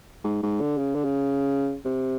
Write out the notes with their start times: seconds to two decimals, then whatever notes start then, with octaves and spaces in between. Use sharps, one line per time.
0.24 G#2
0.43 G#2
0.61 D3
0.78 C#3
0.95 D3
1.04 C#3
1.85 C3